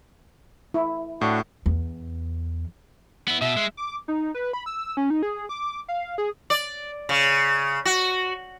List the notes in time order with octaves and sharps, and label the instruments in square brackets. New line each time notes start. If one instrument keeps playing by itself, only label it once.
[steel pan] E4
[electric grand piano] A2 [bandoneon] D4 F#4
[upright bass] E2
[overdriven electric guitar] B3 E4
[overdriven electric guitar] B2 [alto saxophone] E5
[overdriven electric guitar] G#3
[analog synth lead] D6
D#4
B4
B5
E6
C#4
D#4
G#4
D6
F5
G#4
[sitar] D5
C#3
F#4